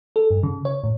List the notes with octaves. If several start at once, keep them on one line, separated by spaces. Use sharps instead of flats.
A4
G2
C#3
C#5
A2